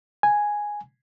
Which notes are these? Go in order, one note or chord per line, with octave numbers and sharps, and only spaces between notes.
G#5